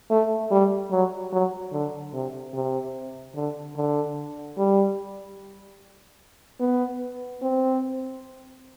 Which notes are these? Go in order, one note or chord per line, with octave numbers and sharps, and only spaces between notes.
A3
G3
F#3
F#3
D3
C3
C3
D3
D3
G3
B3
C4